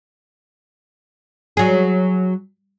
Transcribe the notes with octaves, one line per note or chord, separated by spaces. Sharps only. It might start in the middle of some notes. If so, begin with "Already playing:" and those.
F#3 G#4